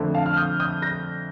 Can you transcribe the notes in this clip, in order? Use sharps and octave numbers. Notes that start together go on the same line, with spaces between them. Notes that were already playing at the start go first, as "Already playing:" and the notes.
Already playing: F2 D3 A3
F5 A5
F6
D#6 G6
D#6 G6
G6 A#6